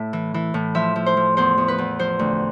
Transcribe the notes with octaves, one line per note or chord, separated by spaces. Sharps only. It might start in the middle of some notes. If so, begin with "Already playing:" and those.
Already playing: A2 E5
E3
E3
A2
F3 E5
F3
C5
F3
E2 C5
E2
B4
E2
F3 C5
D2